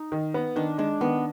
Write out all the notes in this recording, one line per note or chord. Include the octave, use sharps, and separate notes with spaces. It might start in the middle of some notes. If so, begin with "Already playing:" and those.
Already playing: D#4
D#3
B3
D#3 D4
G#3 D4
D#3 B3